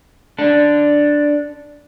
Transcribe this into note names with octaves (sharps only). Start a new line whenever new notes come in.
D4 A4